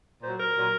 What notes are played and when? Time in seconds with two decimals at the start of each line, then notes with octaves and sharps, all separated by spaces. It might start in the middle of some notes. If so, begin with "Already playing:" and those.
0.22 A#2 F#3 C5
0.40 A#4
0.57 A#2 F#3